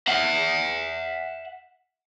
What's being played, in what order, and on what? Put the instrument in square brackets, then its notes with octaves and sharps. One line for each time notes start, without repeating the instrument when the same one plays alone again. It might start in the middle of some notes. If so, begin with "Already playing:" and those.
[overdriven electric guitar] E5 F#5